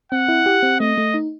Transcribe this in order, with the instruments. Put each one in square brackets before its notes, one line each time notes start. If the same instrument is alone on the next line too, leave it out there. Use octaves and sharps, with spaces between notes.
[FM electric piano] C4 [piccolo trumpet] F#5
[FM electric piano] E4
G4
C4
[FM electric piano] A3 [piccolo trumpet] D#5
[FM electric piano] A3
D#4